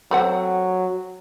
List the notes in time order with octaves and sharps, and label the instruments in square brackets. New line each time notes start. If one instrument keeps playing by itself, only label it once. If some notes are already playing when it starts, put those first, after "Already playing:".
[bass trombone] F#3 [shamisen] A3 C4 F#5